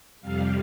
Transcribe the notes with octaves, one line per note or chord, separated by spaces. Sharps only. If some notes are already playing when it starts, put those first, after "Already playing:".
F2 C3 G3 F5